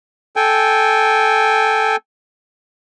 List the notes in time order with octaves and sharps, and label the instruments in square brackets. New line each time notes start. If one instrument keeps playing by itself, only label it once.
[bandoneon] A4 G5 G#5